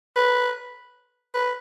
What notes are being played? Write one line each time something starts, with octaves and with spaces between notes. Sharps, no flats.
B4
B4